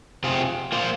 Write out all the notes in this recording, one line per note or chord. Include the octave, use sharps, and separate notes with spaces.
C3 F3 C4 F4 G#4
A#3 F4 C5